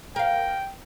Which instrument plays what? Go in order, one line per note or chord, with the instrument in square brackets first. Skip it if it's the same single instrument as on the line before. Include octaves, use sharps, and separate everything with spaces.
[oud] A#4 F5 [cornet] G5